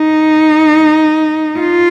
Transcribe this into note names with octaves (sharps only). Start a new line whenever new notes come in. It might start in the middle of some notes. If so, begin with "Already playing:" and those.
Already playing: D#4
F4